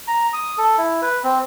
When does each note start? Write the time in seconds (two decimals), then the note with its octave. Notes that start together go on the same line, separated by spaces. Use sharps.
0.08 A#5
0.33 D#6
0.58 A4
0.78 E4
1.02 B4
1.24 C4